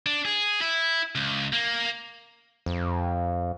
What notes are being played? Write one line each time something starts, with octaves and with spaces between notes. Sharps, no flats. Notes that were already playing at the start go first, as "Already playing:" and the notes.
D4
G#4
E4
C#2
A#3
F2